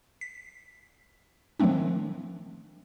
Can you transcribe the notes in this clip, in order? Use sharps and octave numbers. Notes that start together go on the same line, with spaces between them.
B6
D#3 F3 F#3 A3 C4 D4